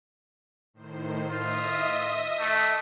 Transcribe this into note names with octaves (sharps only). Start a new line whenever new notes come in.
A2 D#3 C5
F4 D#5 E5 D#6
A3 D6 E6